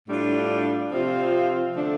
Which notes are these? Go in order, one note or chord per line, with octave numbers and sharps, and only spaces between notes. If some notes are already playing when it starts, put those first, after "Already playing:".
A2 G3 D4 F4
C3 F3 C4 F4
D3 F3 A3 D4